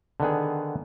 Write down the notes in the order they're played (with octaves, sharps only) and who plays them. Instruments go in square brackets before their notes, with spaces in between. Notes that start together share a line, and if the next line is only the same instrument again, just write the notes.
[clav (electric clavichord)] D3 D#3 B3 G#4